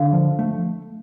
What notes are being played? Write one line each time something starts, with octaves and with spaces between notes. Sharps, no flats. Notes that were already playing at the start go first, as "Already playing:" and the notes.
Already playing: D3 F5
F3
A3